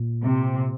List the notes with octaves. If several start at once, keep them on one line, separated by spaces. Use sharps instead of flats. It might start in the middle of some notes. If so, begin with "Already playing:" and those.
Already playing: A#2
C3